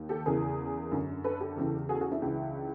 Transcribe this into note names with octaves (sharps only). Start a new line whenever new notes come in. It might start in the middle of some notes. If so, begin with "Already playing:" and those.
Already playing: D#2 D#3
G4 A4
E2 C#3 E3 G#4 A#4
F#2 D3
A4 B4
G4 A4
E2 C#3 E3
F#4 G#4
A4
F#4 G#4
D4 E4
C#2 C#3 E3